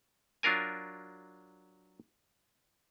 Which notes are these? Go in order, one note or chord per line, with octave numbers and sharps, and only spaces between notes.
F#3 D4 F4 A#4 G#5